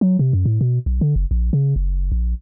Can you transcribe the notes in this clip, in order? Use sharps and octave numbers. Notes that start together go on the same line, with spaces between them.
F#3
C3
F#2
A2
B2
B1
D3
F#1
A#1
C#3
F#1
A#1